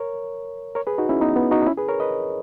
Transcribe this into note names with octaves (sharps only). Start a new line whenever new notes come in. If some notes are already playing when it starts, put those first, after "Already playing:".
Already playing: A#4 C#5
A#4 C#5
G#4 B4
D#4 F#4
C#4 E4
B3 D#4
B3
D#4 F#4
D#4
C#4 E4
G#4 B4
A#4 C#5
B4 D#5